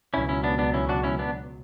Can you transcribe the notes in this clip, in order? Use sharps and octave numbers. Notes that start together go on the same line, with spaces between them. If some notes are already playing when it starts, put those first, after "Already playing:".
C#2 B2 F#3 C#4 E4
C#4 E4
B3 D4
B3 D4
C#4 E4
D4 F#4
C#4 E4
B3 D4